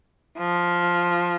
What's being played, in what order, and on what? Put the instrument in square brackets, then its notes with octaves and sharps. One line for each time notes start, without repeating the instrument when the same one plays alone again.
[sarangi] F3